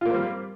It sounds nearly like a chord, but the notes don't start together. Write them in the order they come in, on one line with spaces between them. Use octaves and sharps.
F4 A#3 C4 G3